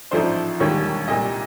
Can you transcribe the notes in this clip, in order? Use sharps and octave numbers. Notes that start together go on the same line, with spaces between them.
A1 G#2 F3 A3 D4 C5
E1 D#2 D#3 G3 C#5
C2 A#2 G3 D#5